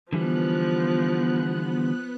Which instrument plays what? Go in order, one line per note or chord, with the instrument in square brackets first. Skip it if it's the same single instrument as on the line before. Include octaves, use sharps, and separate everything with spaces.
[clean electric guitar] D3 E3 G3 [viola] F3 [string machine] B3 F#6